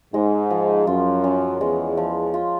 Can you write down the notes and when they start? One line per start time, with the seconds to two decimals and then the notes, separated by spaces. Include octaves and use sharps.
0.14 G#2 G#3
0.50 F3
0.87 F#2 F4
1.24 C#4
1.61 E2 G#3
1.97 F3
2.34 F4